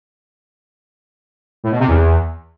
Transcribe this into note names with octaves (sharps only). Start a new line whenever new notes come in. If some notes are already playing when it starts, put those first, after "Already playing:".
A2
B2
C3
E2